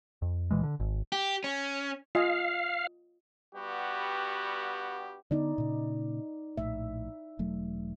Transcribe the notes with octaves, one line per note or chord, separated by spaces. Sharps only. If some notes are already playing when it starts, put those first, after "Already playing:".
F2
C#2 A#2 E3 G#3
D3
G#1
G4
C#4
F4 D#5 F5 G#5
G2 G3 B3 F#4 G4
D3 B3 D#4 D5
A#2 C#3
A#1 A2 E5
E1 F#3 A3